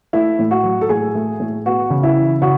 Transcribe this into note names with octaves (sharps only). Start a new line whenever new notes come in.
A3 E4
A2
F#4
F#3
A4
A2 G#4
A3
A2
B3 F#4
C#3
E4
E3
C#3 F#4